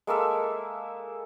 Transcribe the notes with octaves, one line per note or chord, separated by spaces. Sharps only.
G#3 A#3 A4 E5